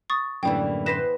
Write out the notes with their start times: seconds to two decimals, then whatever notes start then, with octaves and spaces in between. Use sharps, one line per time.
0.10 C#6 D#6 A6
0.43 F#2 A2 D3 E3 G3 A#3 G5
0.86 E2 B4 C5 A#6 B6 E7